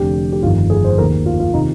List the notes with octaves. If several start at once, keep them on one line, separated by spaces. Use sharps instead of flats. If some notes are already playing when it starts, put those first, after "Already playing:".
Already playing: F1 F2 D3 G4
G4
G1 F2 D#3 F4
G#4
C5
D#2 D#3 A#4
F4
F4
C3 D#3 D#4